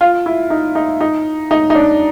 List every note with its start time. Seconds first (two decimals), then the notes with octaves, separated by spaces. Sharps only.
0.01 F4
0.26 E4
0.50 D#4
0.75 D#4
1.01 D#4
1.51 D#4
1.70 D#4
1.75 D4